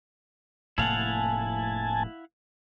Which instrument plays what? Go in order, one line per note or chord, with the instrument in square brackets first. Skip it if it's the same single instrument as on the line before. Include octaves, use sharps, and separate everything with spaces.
[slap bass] F1 A2 A#3 [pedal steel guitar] E4 F5 F#5 [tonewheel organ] G#5 A5